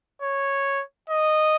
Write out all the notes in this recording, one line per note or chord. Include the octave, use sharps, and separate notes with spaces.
C#5
D#5